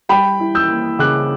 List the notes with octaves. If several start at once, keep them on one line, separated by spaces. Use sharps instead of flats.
G3 G5 B5
E4
E6 G6
A#3
C#3 D6 F#6